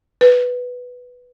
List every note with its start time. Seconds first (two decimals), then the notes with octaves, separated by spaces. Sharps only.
0.21 B4